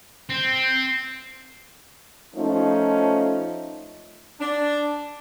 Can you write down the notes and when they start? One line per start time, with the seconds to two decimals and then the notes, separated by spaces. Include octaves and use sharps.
0.30 C4
2.36 F3 A3 C#4 D#4
4.40 D4